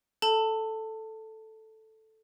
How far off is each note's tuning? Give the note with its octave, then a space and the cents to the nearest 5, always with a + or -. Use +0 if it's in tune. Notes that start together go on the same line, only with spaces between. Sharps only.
A4 +0 A5 +20